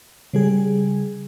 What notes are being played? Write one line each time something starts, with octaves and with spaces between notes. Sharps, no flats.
C#3 G3 G#4